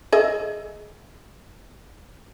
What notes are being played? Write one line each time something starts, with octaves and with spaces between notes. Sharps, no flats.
G#4 D#5 E5